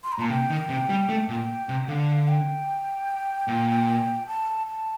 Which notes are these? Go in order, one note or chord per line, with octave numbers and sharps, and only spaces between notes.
C6
A#5
A#2 A5
C3 G5
D#3
C3
G3
A3
A#2
C3
D3 F5
G5
A#2
A5
A5